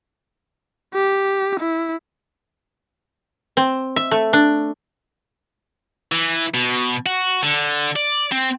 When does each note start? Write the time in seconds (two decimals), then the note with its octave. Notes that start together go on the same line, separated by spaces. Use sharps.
0.94 G4
1.60 E4
3.57 C4
3.96 E5
4.11 A3
4.33 D4
6.12 E3
6.54 B2
7.06 F#4
7.43 D3
7.96 D5
8.32 C4